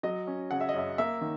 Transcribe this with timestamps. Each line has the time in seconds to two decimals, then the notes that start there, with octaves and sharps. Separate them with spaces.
0.03 F#3 D#5
0.27 C#4
0.51 C#3 F#5
0.61 E5
0.69 D#5
0.74 F#2 E5
0.98 A#3 E5
1.21 D#3